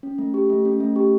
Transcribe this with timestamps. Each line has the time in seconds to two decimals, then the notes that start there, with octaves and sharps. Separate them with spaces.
0.03 C#4
0.18 A3
0.34 G4
0.50 A3
0.65 C#4
0.80 A3
0.96 G4